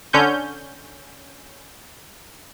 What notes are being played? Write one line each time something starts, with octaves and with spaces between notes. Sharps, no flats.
D3 C#4 G6